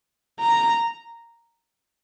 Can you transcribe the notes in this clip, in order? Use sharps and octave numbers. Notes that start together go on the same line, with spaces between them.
A#5